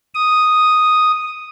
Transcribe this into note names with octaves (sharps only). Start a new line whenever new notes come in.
D#6